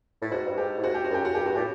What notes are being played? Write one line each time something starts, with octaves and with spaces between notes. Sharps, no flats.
A2
G#2 F#4
G2
G#2 G4
A2
G#2 F#4
G4
F#4
F#2 G4
F#4
G2 G4
F#4
A2 G4